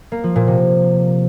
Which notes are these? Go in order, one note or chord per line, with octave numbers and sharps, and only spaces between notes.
A#3
F3
A#2
C3